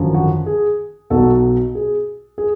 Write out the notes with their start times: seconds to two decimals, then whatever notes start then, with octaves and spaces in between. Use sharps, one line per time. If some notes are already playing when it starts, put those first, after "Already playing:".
Already playing: G#1 F#2 D3 F3
0.14 F#4
0.46 G#4
1.10 B1 B2 F#3 F#4 A4
1.75 G#4
2.38 G#4